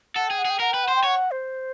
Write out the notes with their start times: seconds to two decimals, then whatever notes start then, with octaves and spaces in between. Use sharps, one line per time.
0.16 A4 F#5
0.28 G#4 G5
0.38 F#5
0.45 G#4 G5
0.60 A#4 F#5
0.72 B4 G5
0.84 C5 F#5
0.95 G5
1.03 C#5 F#5
1.31 C5